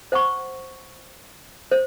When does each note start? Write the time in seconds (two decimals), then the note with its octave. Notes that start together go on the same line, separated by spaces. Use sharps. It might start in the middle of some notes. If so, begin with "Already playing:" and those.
0.12 C5 F#5 C#6
1.72 C5